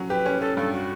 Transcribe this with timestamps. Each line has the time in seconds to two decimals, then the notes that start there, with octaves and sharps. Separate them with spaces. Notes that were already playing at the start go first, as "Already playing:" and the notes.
Already playing: F#3 C#4
0.09 G4 B4
0.26 C#4
0.41 C#4 A4
0.57 G2 A4
0.72 F#4